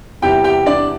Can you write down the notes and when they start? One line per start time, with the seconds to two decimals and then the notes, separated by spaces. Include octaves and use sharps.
0.22 E2 C3 E3 G3 G4 G5
0.44 G4 G5
0.66 D4 D5